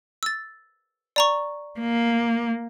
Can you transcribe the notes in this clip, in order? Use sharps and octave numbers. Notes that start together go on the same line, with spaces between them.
E6 A6
D5 A#5 C#6
A#3